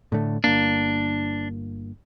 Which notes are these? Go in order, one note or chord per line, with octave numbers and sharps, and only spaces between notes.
A2 D3 A3
G1 A#3 D4